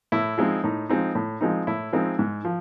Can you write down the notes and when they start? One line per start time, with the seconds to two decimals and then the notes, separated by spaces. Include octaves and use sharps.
0.12 A2 E4
0.38 F3 G#3 C4 D#4
0.64 A2 D#4
0.89 F3 G#3 C4 D#4
1.15 A2
1.41 F3 G#3 C4 D#4
1.67 A2 E4
1.93 F3 G#3 C4 D#4
2.19 G#2
2.45 F3